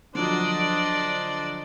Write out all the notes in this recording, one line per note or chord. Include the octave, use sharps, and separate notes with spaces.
D3 F3 F#3 D4 C5 D5 D#5